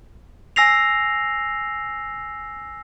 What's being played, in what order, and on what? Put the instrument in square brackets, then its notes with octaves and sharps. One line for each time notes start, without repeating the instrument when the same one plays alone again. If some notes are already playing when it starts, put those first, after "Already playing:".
[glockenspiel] G#5 E6 A#6 C7 F7